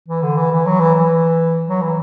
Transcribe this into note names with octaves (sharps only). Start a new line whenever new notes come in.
E3
D3
E3
E3
F#3
E3
E3
F#3
E3